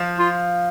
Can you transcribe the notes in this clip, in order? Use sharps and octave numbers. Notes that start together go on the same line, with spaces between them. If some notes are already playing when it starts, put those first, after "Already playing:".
Already playing: F3
F4